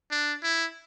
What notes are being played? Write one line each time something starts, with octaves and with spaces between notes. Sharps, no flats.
D4
E4